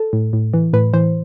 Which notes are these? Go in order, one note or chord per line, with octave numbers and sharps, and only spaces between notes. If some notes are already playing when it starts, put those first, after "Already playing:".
Already playing: A4
A2
A2
E3
A2 B4
E3 C5